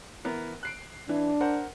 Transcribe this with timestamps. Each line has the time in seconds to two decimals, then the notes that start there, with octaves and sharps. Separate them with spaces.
0.25 E3 B3 A#4
0.63 F#6 C7 D7
1.09 E3 D4
1.41 A#4 C5 F#5